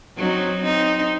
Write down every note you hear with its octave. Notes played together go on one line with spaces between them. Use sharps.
F#3 C4 D#4
C4 D#4